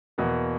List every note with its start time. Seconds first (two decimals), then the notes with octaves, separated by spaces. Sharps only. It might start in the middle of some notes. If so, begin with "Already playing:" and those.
0.18 E2 B2 A#3